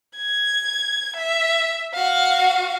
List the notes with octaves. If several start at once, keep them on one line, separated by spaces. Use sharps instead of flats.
G#6
E5
F#4 F5